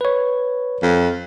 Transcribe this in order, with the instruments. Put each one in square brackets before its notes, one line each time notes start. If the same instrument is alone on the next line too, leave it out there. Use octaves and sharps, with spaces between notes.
[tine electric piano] B4 C#5
[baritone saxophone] F2